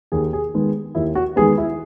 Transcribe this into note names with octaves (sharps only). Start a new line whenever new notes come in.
D#2 G#4
G#4
D#3 G#3 B3
D#2 E4
F#4
D#3 G#3 B3 G#4
E4